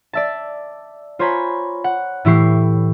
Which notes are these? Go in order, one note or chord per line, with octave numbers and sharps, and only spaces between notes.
D5 E5 A5
F4 C5 C#5 G#5 A#5 B5
F#5
A2 E3 E4 G4 C#6 C7